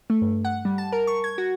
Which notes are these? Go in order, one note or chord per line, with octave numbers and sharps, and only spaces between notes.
A3
G2
F#5
G3
A5
A#4
C#6
G#6
F#4